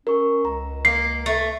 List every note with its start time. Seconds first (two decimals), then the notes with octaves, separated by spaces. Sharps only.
0.07 C#4 A#4 C#6
0.45 C#2 A#5
0.85 A#3 C7
1.26 A3